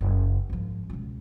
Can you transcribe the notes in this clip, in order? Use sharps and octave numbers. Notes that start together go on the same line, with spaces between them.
F#1 C#3
G#1 F3
C#2 B2